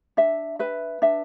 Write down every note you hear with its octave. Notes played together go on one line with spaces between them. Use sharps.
D4 E5
B4 E5
D4 E5